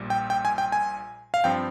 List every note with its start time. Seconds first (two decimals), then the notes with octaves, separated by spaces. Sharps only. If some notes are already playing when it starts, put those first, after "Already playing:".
Already playing: A#1 A#2 G3
0.10 G5
0.30 G5
0.45 G#5
0.58 G5
0.72 G#5
1.34 F5
1.44 G2 F3 C4 G5